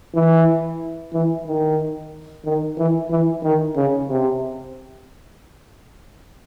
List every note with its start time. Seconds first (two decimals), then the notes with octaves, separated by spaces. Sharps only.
0.15 E3
1.13 E3
1.47 D#3
2.45 D#3
2.78 E3
3.11 E3
3.43 D#3
3.76 C#3
4.09 C3